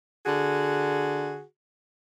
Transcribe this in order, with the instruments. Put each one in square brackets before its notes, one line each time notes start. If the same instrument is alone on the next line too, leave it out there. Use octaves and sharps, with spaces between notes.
[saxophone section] D3 F#4 G#4